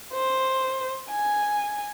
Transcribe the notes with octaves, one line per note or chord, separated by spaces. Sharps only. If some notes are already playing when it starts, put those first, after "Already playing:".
C5
G#5